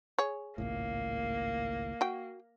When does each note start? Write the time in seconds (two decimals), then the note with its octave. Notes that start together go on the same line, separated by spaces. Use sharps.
0.18 G#4 C#5
0.58 G#1 C#2 A2 A#3
2.01 F#4 G5